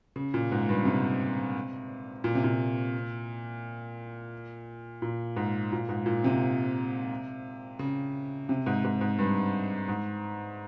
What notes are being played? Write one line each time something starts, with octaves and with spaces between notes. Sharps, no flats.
C#3
A#2
G#2
G2
C3
A#2
C3
A#2
A#2
G#2
A#2
G#2
A#2
C3
C#3
C3
G#2
G#2
G#2
G2
G#2